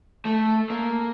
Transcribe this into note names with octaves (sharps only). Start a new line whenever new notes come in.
A3
A#3